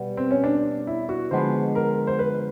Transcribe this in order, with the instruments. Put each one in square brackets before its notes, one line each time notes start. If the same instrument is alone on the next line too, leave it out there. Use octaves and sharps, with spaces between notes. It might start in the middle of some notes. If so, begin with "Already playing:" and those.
Already playing: [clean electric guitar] B2 G3 B3
[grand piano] C4
C#4
D4
E4
F#4
[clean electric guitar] D3 F3 G#3 B3 [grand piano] C5
[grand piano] A#4
C5
B4